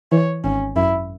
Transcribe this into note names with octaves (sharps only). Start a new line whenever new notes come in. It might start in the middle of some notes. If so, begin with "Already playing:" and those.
E3 C#5
G#1 C#4
F#2 E4